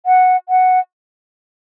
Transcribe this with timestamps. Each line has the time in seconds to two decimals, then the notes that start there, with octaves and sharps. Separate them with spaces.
0.06 F#5
0.49 F#5